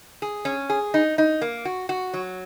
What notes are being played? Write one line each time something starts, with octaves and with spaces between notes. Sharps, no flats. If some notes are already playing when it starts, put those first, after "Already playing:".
G#4
C#4
G#4
D#4
D#4
A#3
F#4
F#4
F#3